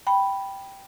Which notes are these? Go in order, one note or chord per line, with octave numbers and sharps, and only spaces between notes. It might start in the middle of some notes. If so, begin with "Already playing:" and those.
G5 B5